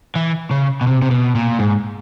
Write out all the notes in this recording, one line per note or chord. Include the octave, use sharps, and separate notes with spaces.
E3
C#3
B2
C3
C3
B2
A#2
G#2